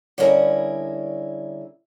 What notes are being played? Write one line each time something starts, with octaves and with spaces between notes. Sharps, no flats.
D3 G3 C#4 E4 G#4 A#4